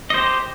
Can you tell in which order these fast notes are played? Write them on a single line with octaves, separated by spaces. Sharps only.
D#5 C5 G4